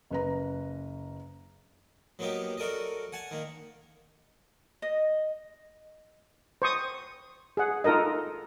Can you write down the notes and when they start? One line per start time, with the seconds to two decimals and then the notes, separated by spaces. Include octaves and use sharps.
0.10 F#1 B4 A#5
2.19 F#3 A#3 B3 D#4 G4
2.58 F#4 A4 A#4 D5 D#5
3.12 F#5 G#5 A5
3.31 D#3 A#3
4.82 D#5
6.62 C5 C#6 D#6
7.57 G#4 F#5
7.84 D#4 F4 A4 A#4 D#5